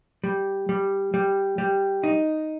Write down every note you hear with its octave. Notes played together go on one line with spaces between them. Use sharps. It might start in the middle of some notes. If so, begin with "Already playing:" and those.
G3
G3
G3
G3
D#4